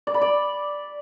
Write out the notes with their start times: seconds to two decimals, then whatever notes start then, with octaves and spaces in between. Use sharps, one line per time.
0.07 D5
0.14 B5
0.22 D5